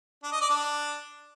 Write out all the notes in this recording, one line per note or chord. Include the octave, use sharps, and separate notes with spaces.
D4
D#5
D5
D4